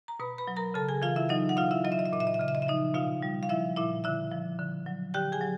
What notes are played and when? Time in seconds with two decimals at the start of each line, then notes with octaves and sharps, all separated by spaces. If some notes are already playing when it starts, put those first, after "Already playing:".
0.08 A#5
0.20 B2 B4 B5
0.38 B4 B5
0.48 F#3
0.56 A#4 A#5
0.74 C#3 A4 A5
0.89 G#4 G#5
1.02 E3 F4 F5
1.16 E4 E5
1.29 F#3 D#4 D#5
1.49 F#5
1.57 B2 F4 F5
1.71 E4 E5
1.85 F#3 D#5
1.92 E5
1.99 D#5
2.06 E5
2.13 A#2 D#5
2.20 E5
2.27 D#5
2.34 E5
2.39 C#3 D#5
2.48 E5
2.55 D#5
2.62 E5
2.67 F3 D#4 D#5
2.94 B2 F4 F5
3.23 G3
3.43 F5
3.49 F3 E4 E5
3.77 A#2 E4 E5
4.04 D3 E4 E5
4.31 F3
4.59 D3
4.86 F#3
5.14 D3 G4 G5
5.32 G#4 G#5
5.41 F#3